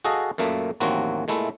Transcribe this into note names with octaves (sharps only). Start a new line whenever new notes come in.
F#4 G#4 A4 D#5 F5
F#2 A#2 A3 A#3
A1 D#2 F#3 A#3 C4 F#4
A#2 G#3 A3 E4